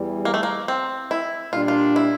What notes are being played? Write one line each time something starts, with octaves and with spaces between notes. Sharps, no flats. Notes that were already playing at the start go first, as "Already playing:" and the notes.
Already playing: E2 E3 G3
A#3
A3
A#3
C4
E4
A#2 G3 D4 F4
F4
E4